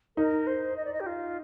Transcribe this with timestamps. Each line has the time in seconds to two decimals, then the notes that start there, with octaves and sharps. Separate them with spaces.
0.17 D#4 A#4
0.47 C5
0.76 D#5
0.85 D5
0.93 D#5
1.00 G4
1.06 F4